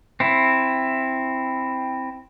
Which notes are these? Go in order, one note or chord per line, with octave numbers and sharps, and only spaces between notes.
C4 E4